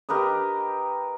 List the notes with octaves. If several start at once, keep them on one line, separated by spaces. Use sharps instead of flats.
G4 A#4 B4 D#5